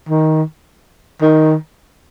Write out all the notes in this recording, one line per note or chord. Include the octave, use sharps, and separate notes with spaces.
D#3
D#3